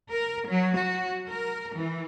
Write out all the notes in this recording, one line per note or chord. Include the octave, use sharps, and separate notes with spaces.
A#4
F#3
F#4
A#4
E3